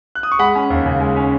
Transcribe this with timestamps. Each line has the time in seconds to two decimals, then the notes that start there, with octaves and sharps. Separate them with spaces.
0.15 F#6
0.23 D#6
0.32 C#6
0.39 G#3 F#5 B5
0.55 C#4
0.70 D#2
0.86 C#3
1.00 G#3
1.16 C#4